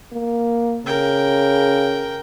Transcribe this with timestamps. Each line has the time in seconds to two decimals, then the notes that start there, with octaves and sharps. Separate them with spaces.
0.13 A#3
0.86 C#3 A#4 G5